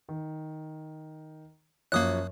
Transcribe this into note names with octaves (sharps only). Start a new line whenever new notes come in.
D#3
F#2 F3 A#3 C#5 D#6 F#6